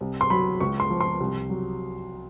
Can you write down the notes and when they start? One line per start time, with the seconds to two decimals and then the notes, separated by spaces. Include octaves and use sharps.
0.01 C2
0.21 C6
0.30 F#3 B5
0.60 C#2 C#6
0.80 C6
0.90 F3
1.01 C6
1.20 C2
1.50 F#3